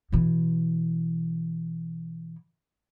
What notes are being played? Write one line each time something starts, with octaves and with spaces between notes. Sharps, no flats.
B2 E3